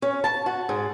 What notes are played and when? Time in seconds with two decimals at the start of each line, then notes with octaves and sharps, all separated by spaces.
0.02 C#4
0.24 A5
0.46 F#4
0.69 G#2